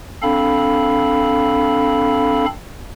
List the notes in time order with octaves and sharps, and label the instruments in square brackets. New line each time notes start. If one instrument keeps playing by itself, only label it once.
[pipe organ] C4 D4 A4 F5 B5